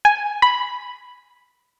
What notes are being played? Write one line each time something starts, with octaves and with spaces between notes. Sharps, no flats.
G#5
B5